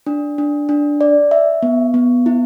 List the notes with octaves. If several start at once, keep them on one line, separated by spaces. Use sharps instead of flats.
D4
D4
D4
D5
E5
B3
B3
E4